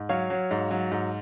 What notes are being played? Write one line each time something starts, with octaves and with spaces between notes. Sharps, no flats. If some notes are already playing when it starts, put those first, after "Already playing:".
Already playing: G#2
F#3 C#5 F5
F#3
G#2
F#3
G#2